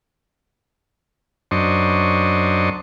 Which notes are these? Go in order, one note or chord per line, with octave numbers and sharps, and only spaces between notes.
F#2 D4 C5 D#5 C#6